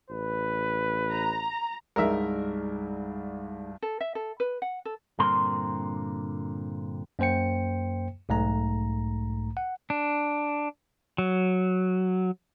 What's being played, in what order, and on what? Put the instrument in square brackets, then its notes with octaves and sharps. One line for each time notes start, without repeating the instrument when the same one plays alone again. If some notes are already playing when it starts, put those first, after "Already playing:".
[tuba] A1 [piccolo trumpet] B4
[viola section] A#5
[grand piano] C2 G2 [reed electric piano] G#3 D#4 G#4 [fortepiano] A#4 E5
[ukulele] A4
E5
A4
B4
F#5
A4
[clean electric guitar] G2 A#2 D3 C4 A#4 C6
[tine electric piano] F#2 A#3 C5 G5 C#7
B1 G#2 A3 A#5
F#5
[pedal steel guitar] D4
F#3